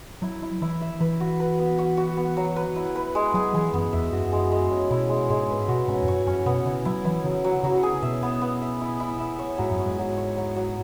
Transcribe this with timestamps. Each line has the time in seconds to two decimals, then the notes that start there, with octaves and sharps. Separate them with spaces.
0.22 F#3 E4
0.42 E4
0.62 E3 E4
0.81 E5
1.00 E3 B4
1.20 F#4
1.40 B4
1.59 B3
1.78 F#4
1.97 F#4
2.17 B3
2.37 F#3
2.56 B4
2.76 E4
2.95 B4
3.15 G#3
3.34 F#3 G#4
3.55 E3 G#4
3.73 F#2 B3
3.93 E2 E5
4.12 F#2 F#4
4.32 G#3
4.52 G#3
4.71 C#4
4.91 B2 E4
5.09 G#3
5.30 G#2 G#3
5.50 B4
5.68 B2 F#4
5.88 G#2 C#4
6.02 E2
6.08 F#2 C#5
6.26 F#2 C#4
6.46 B2 B3
6.65 C#3 E4
6.85 F#3 E4
7.04 E3 E4
7.24 C#3 F#3
7.44 F#3
7.63 C#3 F#3
7.83 G#4
8.02 B2 E5
8.23 B3
8.41 B3
8.62 E5
8.81 E4
9.00 E4
9.19 E5
9.39 C#5
9.58 G#2 F#3
9.71 F#2
9.78 C#5
9.85 G#2
9.98 F#3
10.17 C#5
10.36 F#3
10.56 F#3